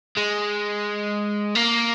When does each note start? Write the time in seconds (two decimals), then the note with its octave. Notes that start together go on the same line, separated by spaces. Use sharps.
0.17 G#3
1.55 A#3